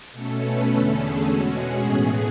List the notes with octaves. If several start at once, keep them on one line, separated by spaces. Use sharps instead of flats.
B2 A3 C#4 A4
B4
E2 D3 A3 C#4 A4
G#4
B2 G#3 C#4 F#4
G#4
A2 E3 B3 G#4